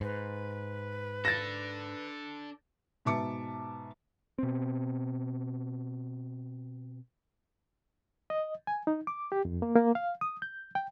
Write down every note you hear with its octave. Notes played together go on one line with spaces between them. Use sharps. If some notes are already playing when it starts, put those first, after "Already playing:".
G#2 B4
D4 A4 A6 A#6
G#2 B2 E5 A5 D6 C#7
B2 C4
D#5
G#5
D#4
D6
G4
F2
A#3
A#3
F5
D#6
G6
G5